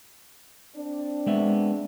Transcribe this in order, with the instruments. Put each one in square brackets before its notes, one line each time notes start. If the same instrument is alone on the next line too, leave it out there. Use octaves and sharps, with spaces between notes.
[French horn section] C4 D4
[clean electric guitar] G#3 B3 E5